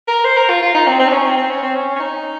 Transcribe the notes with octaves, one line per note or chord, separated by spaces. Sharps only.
A#4
C5
A#4
F4
F4
D#4
C4
C4
D#4
C#4
C4
C4
C#4
C4
C#4
C#4
D#4